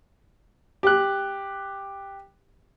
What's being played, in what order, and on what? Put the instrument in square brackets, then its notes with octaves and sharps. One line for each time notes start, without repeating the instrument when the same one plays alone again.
[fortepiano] G4 F#6